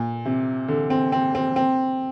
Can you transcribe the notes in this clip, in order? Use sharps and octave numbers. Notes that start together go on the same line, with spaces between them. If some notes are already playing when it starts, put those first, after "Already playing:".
Already playing: A#2
C3
D3
C4
C4
C4
C4